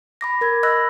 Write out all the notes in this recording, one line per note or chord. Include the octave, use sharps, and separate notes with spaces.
B5 D6 A#6
A#4 G#6
D#5 B5 E6 F#6 A#6